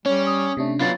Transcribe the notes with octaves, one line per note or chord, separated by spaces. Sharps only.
G3 C#4 C#5
D#6
C3 A3 C#4 D4
F#3 B3 F4 B5 A6